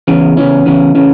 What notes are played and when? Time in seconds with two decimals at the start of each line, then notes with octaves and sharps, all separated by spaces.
0.08 E2 C#3 E3 C#4
0.37 E2 C#3 E3 C#4
0.66 E2 C#3 E3 C#4
0.95 C#3 E3 C#4